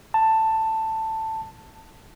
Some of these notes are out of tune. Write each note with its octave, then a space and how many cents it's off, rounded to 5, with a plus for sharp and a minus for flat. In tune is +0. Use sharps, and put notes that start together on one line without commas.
A5 +10